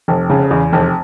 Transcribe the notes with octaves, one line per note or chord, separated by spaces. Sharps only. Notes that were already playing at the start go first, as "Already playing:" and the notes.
F1
C#3
E2
F1